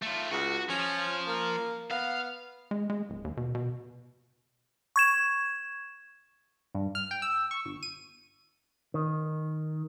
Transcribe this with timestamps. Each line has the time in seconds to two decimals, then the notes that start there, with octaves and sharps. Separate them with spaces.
0.03 A3 F4
0.31 C#2 F#4
0.69 F3 C#4
1.27 A#3
1.91 B3 F5
2.71 G#3
2.90 G#3
3.10 D1
3.24 D#2
3.37 B2
3.55 B2
4.96 C#6 G#6 E7
6.75 G2
6.95 F6
7.11 G5
7.22 E6
7.51 C#6
7.65 G1
7.83 D#7
8.94 D#3